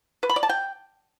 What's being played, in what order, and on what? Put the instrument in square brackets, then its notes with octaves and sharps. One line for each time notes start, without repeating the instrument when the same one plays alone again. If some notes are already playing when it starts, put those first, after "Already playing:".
[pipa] B4
B5
D5
A5
G5